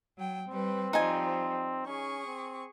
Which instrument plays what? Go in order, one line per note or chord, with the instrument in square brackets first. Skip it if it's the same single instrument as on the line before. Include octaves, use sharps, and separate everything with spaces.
[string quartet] F#3 G5
[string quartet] G3 B4 [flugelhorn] C4
[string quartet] F3 G3 [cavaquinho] D#4 G#5
[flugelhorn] C#4 [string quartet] G#4 C#6
[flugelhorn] C4